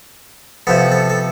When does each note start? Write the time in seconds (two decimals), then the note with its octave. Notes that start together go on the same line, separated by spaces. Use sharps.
0.67 C3 F3 B3 A4
0.92 A4
1.10 A4